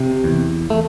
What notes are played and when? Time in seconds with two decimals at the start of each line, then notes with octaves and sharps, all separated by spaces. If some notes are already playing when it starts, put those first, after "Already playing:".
Already playing: C3
0.24 E2
0.70 A3